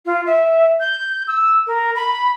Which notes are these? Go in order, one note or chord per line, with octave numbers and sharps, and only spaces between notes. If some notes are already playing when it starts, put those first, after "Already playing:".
F4
E5
G6
E6
A#4
B5